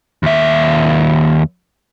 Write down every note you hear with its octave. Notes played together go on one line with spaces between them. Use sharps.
D#2 E5